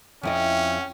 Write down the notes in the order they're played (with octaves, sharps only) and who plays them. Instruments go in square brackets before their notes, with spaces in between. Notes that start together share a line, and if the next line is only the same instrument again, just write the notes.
[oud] F2 E4 D#5 [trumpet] C#4 [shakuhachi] G5